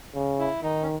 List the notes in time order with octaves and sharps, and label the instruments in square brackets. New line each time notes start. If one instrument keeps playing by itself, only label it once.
[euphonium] C#3
[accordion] E4
[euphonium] D#3 [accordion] D#4
[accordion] C#4